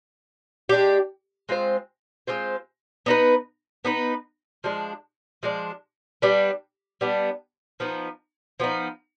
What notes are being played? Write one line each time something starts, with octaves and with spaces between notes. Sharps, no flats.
G#3 D4 G4
G#3 C4 F4 C5
G#3 C4 F4 C5
B3 D#4 B4
B3 D#4 B4
F3 G#3 D4
F3 G#3 D4
G3 B3 D4
G3 B3 D4
F3 B3 D#4
F3 B3 D#4